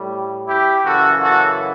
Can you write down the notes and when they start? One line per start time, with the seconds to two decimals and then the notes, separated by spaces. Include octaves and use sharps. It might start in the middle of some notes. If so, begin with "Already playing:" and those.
Already playing: A2 G3
0.47 E4 G4
0.85 F#2 C#3 E3 F#4 A4
1.22 F#4 A4